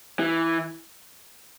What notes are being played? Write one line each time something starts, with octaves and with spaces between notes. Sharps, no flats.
E3